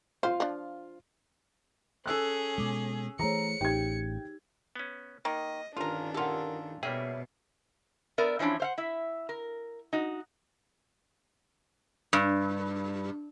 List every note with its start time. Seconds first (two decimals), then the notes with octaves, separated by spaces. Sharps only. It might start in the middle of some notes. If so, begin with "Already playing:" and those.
0.23 F4 C5 F5
0.40 F3 D4
2.06 C#4 G#4 A4 E6 F#6
2.58 B2 G#3 G#5 D6
3.19 E3 A3 G#4 C5 C#5 A#5 C#7
3.61 A1 D#4 G4 G5 G#6
4.76 B3 C#4
5.25 D#3 A#3 D#5
5.77 G1 D#3 C#4 D4 F4 A#4
6.14 F4 G4 A4 A#4 F#5
6.83 B2 G3 A#3 G#4 C#5 E5 G5
8.18 B3 A#4 D5 E5
8.39 E3 F3 C#4 D4 E4
8.60 C5 F5 F#5
8.78 E4 E5
9.29 A#4
9.93 D#4 F#4
12.13 G2